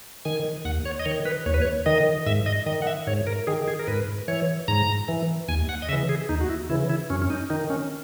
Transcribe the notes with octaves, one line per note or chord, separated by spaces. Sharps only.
D#3 G#5
D#2 F#5
C#5
D#5
D#3 C#5
B4
D#2 C#5
B4
C#5
D#3 D#5
G#2 E5
D#5
D#3 D#5
F#5
E5
G#2 C#5
A#4
D#3 G#4
G#4
A#4
G#2 B4
E3 C#5
G#2 A#5
E3
D#2 G#5
F#5
D#5
C#3 E3 E5
G#4
D#2 D#4
F#4
E4
C#3 E3 E4
E4
F#2 C#4
C#4
D#4
D#3 D#4
C#4